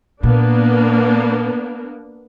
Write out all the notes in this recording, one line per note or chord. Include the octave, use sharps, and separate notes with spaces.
A#2 A#3 B3 D4